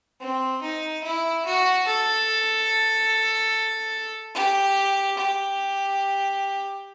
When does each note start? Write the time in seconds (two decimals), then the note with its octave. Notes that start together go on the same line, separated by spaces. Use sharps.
0.20 C4
0.62 D#4
1.03 E4
1.45 F#4
1.86 A4
4.35 G4
5.17 G4